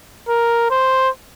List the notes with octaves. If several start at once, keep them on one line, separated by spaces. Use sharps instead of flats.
A#4
C5